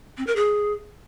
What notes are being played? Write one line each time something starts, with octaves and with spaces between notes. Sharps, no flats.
C4
A#4
G#4